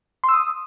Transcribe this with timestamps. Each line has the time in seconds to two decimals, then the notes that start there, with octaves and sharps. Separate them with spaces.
0.24 C6
0.29 E6
0.34 D#6